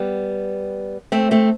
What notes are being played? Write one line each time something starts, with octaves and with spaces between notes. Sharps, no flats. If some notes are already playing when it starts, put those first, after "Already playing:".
Already playing: G3 B3
A3 C4
A3 C4